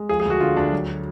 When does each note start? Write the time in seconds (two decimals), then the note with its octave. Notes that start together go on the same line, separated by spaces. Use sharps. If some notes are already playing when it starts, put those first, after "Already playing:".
Already playing: G#3
0.09 F3 G#4
0.20 G#4
0.25 D2
0.30 F#4
0.41 D3 F4
0.57 D2 D4
0.72 F#3